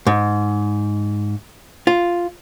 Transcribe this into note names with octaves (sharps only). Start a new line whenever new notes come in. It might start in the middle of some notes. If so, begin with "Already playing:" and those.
G#2
F4